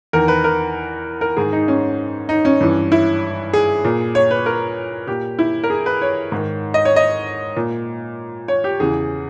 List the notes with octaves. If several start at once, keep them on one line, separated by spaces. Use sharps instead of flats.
E2 D#3 A#4
B4
A#4
A#4
G#2 D#3 G#4
D#4
C#4
D#4
C#4
G2 E3
E4
G#4
A#2
C#5
B4
A#4
A#2 G4
E4
A#4
G#4
B4
C#5
G#2 D#3
D#5
C#5
D#5
A#2
C#5
G4
E2 C#3 E3 G#4